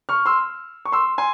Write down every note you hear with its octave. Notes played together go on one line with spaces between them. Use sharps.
C#6 F6
C6 E6
C#6
C6 E6
G#5 C6